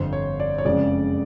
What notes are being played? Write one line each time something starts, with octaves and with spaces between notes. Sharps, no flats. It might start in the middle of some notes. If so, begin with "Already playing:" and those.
Already playing: G1 F2 D3 C5
C#5
D5
C#5
F#1 F2 C#3 F3 G#3 D5